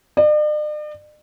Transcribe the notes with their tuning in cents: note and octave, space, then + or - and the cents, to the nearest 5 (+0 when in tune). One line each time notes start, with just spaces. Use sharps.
D5 +45